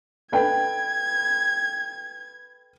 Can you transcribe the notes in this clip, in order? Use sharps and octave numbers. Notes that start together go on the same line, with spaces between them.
A4 B4 G5 G#6